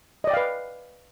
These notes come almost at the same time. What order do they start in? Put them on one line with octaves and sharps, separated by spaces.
D#5 D5 G5 F5 B4